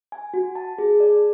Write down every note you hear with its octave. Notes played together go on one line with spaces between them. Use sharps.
G#5
F#4
A5
G#4
D5